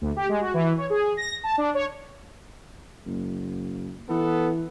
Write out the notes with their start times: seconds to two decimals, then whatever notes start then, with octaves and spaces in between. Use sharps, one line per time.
0.01 D2
0.16 G4
0.29 G#3
0.41 F#4
0.54 E3
0.78 C#5
0.90 G#4
1.17 A#6
1.44 A5
1.58 D4
1.74 C#5
3.06 F#1
4.09 E3 B3 A4